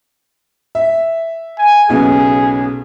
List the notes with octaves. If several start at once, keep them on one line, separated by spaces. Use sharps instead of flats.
E5
G#5
B1 C#3 B3 G#4